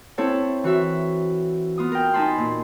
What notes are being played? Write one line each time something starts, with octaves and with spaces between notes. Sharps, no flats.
C4 E4 A4 C#5 A5
E3 F#4 E5
B3 F4 D#6
A#4 G5
D#4 G#5 A5 B5 C6
A#2